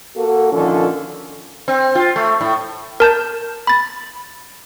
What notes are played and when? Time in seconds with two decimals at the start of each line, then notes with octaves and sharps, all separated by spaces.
0.15 A#3 F#4 A4
0.52 A#2 D3 D#3 F3 C#4 A4
1.68 C4
1.95 F4
2.16 A3
2.41 A2
3.00 A#4 A5 G6
3.67 B5 A6